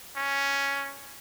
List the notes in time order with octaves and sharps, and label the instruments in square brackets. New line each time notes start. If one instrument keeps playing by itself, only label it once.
[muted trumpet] C#4